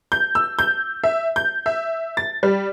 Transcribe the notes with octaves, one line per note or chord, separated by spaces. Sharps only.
G6
E6
G6
E5
G6
E5
A6
G3